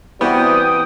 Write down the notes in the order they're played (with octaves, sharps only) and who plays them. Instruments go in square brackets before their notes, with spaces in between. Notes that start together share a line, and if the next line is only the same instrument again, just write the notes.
[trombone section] C3 G3 [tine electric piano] E3 F#4 [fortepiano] B3 [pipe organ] G5 D#6